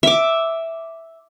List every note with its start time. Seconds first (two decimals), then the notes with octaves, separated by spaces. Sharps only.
0.03 E5 D6